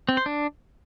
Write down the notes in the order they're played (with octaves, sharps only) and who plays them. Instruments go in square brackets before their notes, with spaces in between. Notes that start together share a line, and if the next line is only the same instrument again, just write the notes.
[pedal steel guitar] C4
C5
D4